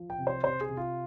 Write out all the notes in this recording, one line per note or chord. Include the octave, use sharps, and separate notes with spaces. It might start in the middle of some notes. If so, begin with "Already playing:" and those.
Already playing: F3
G5
C3
C5
C3 C5
G#4
C3
F4